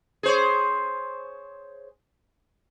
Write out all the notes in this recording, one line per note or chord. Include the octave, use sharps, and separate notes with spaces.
G#4 C5 C#5